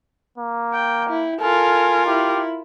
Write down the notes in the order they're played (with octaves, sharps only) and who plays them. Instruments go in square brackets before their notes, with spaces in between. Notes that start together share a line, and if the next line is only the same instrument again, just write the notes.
[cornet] A#3
[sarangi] G5
E4
[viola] F4 A#4 [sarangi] A4 [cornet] G#5
[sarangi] E4 [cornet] G4